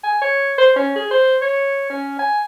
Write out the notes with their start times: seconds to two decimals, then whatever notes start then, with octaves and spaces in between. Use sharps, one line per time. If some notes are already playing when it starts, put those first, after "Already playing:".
0.04 G#5
0.22 C#5
0.58 C5
0.76 C#4
0.96 G#4
1.11 C5
1.42 C#5
1.90 C#4
2.19 G#5